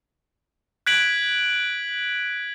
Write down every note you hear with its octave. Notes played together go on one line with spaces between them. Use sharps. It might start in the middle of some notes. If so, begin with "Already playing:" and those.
F#6 G#6 B6 D7 F#7